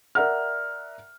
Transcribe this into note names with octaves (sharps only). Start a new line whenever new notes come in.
A#4 D5 E5 F#5 A#5 F6